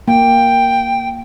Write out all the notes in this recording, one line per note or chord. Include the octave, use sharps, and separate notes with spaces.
A#3 G5